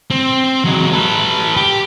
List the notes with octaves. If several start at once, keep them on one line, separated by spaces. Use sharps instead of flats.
C4
F#3 G#3
A4 B4
G4